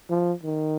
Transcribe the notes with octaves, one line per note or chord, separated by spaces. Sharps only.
F3
D#3